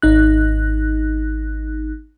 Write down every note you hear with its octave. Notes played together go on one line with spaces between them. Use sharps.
G#1 D#4 F#6